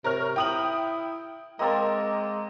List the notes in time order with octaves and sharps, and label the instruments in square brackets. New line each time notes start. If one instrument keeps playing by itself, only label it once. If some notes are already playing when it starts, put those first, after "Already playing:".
[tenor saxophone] C3 [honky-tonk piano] A#4 C#5 F6
[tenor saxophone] E4 [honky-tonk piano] G5 D#6 F#7
[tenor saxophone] G#3 [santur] A#3 C4 A5 [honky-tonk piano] A#4 D#5